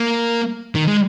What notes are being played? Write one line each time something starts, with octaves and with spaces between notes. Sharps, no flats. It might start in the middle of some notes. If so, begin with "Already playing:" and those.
Already playing: A#3
D#3
G#3